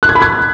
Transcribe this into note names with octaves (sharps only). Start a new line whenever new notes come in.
F#6
G#6
B5
G#6